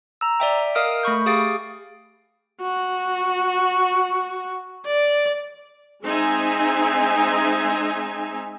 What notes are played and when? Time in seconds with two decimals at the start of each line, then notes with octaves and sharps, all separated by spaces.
0.21 A#5 E6
0.40 D5 E5 G5
0.75 A#4 D#5 F5 D#6 F6 D7
1.03 A3 B5 C#6 G6
1.26 G4 G#4 F5 D#6 A6 D7
2.62 F#4
4.86 D5
6.03 G#3 C4 D#4 E5 G#5